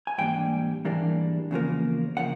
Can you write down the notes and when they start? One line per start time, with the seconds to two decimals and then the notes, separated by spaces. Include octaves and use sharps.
0.07 G#5
0.18 G#2 E3 G3 A#3 D4 G5
0.85 G#2 E3 G3 A#3 D4
1.51 E2 C#3 F3 A#3
2.17 C#3 F3 A#3 F#5